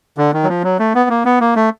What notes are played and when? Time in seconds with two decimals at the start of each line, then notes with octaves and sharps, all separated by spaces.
0.18 D3
0.33 D#3
0.44 F#3
0.49 F3
0.64 F#3
0.79 A3
0.95 B3
1.10 A#3
1.25 B3
1.41 A#3
1.56 A3